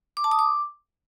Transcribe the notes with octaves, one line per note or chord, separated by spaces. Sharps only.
D6
A5
D#6
D6